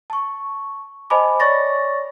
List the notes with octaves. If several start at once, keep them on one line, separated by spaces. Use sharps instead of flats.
A5 C#6
C5 D#5 G#5 A5 B5 D6
C#5 D5 C#6 A6 A#6